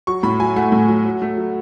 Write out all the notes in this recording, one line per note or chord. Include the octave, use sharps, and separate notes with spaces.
F#3 C#6
A2 B5
F#3 G#5
A3 F#5
A2
F#3
F#3
A3
F#3